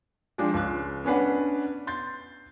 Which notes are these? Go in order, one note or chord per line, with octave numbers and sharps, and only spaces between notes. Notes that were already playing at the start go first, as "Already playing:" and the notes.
F3 G#3 D4 G4
C#2 F#6
B3 C#4 D4 B4 F#5
C6 G6 A6